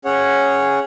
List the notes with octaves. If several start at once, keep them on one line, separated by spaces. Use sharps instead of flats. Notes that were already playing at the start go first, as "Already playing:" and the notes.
C#4 G#4 C#5 F#5